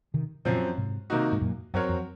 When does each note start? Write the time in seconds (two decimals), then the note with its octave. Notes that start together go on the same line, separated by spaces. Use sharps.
0.14 C3 D#3
0.45 F#2 A#2 C#3 F3 C4
0.78 G#2 C3
1.10 C3 D#3 A#3 D#4 F#4
1.32 G#2
1.41 F#2 A#2
1.74 F#2 F#3 C4 F#4 A#4 C#5
1.89 F2